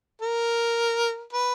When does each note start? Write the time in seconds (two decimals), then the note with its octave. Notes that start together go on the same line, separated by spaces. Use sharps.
0.21 A#4
1.33 B4